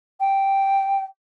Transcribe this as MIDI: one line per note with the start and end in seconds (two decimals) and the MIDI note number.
0.20 1.04 79